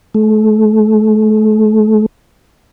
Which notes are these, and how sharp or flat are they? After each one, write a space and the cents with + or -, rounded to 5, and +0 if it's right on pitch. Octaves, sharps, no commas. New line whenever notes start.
A3 -35